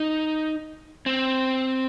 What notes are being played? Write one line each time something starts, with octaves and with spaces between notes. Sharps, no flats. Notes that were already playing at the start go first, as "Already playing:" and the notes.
Already playing: D#4
C4